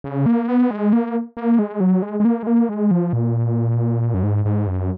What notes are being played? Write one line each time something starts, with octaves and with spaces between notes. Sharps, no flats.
C#3
A#3
B3
G#3
A#3
A#3
G#3
F#3
G#3
G#3
A#3
G#3
A#3
G#3
F3
A#2
F#2
G#2
G#2
F#2